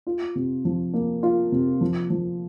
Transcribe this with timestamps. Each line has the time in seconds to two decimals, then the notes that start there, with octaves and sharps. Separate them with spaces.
0.07 F4
0.35 C3
0.65 F3
0.94 A#3
1.23 F4
1.52 C3
1.81 F3
2.10 F3